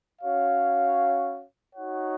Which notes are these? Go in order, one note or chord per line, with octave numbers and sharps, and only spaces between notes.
C#4 F#4 C#5 F5
D#4 F#4 C#5 F#5